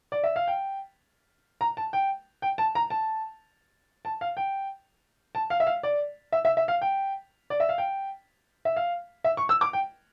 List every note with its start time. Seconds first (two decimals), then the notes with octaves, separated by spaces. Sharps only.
0.12 D5
0.24 E5
0.36 F5
0.48 G5
1.61 A#5
1.77 A5
1.93 G5
2.42 G5
2.58 A5
2.75 A#5
2.90 A5
4.05 A5
4.21 F5
4.37 G5
5.35 A5
5.50 F5
5.60 E5
5.67 F5
5.83 D5
6.32 E5
6.45 E5
6.57 E5
6.68 F5
6.82 G5
7.50 D5
7.60 E5
7.69 F5
7.78 G5
8.65 E5
8.76 F5
9.24 E5
9.37 C#6
9.49 E6
9.61 D6
9.73 G5